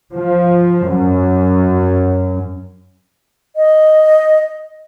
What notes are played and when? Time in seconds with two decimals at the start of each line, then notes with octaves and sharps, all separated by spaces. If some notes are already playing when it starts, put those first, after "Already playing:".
0.13 F3
0.88 F#2
3.56 D#5